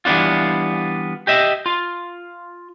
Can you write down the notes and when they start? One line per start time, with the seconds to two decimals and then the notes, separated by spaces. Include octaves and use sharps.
0.05 E3 G3 B3 D4 F4
1.27 G4 D#5 E5
1.66 F4